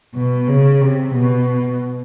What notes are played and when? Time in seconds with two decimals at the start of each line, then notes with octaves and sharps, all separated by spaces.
0.14 B2
0.48 C#3
0.81 C3
1.14 B2